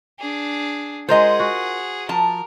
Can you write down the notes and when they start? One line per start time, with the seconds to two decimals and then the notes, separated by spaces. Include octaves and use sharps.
0.19 D4 G#4
1.09 G#3 F4 G#4 A#4 C5 D#5 F#5
1.40 F#4
2.09 F3 A#4 A5